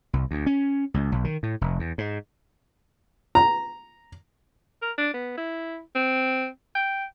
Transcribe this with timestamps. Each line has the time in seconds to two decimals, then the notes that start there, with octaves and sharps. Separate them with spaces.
0.13 C2
0.31 D2
0.46 C#4
0.94 C#2
1.12 B1
1.24 D#3
1.43 A2
1.61 F1
1.79 E2
1.98 G#2
3.35 A#5
4.82 A#4
4.98 D4
5.14 B3
5.37 E4
5.95 C4
6.75 G5